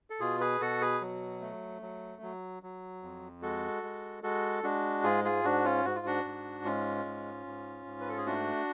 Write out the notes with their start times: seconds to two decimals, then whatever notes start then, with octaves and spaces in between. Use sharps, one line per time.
0.10 A4
0.20 B2 F4 G#4
0.41 G#4 B4
0.61 B2 F#4 A4
0.81 G#4 B4
1.01 F#3
1.41 A3
1.82 F#3
2.22 F#3
2.63 F#3
3.03 F2
3.42 G#3 F#4 A4
3.83 G#3
4.23 G#3 F#4 A4
4.63 G#3 D4 F#4
5.03 G#2 F4 G#4
5.25 F4 G#4
5.44 G#2 D4 F#4
5.65 C#4 F4
5.85 G#2 F#4
5.96 F4
6.06 D4 F#4
6.25 G#2
6.65 G#3 C#4 F4
7.05 G#2
7.46 G#2
7.86 G#2
8.01 B4
8.09 A4
8.17 G#4
8.26 A3 D4 F#4